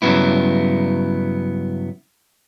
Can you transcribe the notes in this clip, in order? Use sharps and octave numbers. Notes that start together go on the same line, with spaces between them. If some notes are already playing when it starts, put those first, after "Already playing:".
G2 C#3 F3 F#3 B3 E4